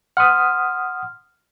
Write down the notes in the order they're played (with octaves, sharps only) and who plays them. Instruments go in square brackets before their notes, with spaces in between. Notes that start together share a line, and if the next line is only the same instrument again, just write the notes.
[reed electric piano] F#5 D#6 [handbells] C6 F6